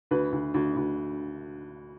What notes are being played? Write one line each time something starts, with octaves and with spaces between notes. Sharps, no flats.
D2 B4
D2
D2
D2